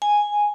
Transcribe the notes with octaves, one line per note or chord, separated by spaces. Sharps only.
G#5